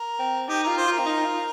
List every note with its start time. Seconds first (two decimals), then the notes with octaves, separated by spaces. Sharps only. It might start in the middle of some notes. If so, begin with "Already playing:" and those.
Already playing: A#4
0.19 C4
0.48 D#4 G4
0.63 F4 A#4
0.77 C5
0.87 F4 A#4
0.99 C4
1.06 D#4
1.25 F4